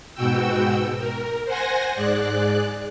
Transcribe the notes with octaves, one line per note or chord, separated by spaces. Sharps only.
G#2 B2 F#4 G5 E6
A#4
C5 F#5 G#5 A#6
G#2 G#3 D5 F#6